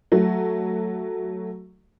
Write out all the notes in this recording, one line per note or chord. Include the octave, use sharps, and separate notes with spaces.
F#3 A3 F#4